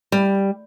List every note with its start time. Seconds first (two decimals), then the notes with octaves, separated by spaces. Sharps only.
0.12 G3